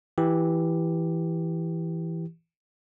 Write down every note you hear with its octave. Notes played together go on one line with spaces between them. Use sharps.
E3 G4